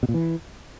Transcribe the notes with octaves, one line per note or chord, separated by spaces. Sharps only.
B2
A#2
E3